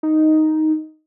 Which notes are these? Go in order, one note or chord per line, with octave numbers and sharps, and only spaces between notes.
D#4